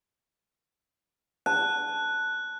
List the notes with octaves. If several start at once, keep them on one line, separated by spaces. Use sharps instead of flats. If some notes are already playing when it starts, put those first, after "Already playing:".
A5 F#6